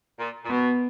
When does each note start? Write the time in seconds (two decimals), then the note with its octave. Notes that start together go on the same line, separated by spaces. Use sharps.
0.19 A#2
0.44 A#2
0.49 B2 B3